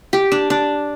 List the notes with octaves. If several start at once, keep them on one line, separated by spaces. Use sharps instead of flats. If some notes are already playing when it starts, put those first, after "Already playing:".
G4
D4
D4